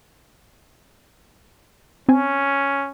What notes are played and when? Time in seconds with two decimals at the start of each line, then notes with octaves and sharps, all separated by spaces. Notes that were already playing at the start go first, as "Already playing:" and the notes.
2.09 C4 C#4 G#5